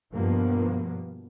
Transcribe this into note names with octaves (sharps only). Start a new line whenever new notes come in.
G2 B2 F3 A#3 B3